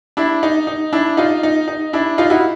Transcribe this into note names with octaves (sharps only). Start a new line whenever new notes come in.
D4 E4
D#4
D#4
D4 E4
D#4 F4
D#4
D#4
D4 E4
D#4 F4
E4 F#4